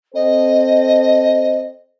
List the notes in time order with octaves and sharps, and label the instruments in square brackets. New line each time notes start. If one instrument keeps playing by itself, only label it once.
[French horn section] C4 A4 C5 [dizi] D#5